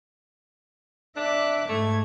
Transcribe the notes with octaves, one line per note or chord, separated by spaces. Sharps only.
D4 E5 D6 F#6
G#2 A3 G#6